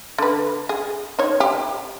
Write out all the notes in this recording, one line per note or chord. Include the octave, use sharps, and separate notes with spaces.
D3 B4
G#4
D#4 C#5
G4